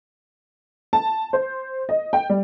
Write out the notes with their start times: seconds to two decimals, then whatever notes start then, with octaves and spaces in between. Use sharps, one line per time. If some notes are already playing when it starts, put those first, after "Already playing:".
0.93 A5
1.33 C5
1.89 D#5
2.13 G5
2.30 G3